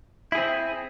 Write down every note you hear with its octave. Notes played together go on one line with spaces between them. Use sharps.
C4 E4 G#4